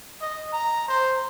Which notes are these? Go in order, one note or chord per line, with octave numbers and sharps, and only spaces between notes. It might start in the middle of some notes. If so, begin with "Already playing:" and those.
D#5
A#5
C5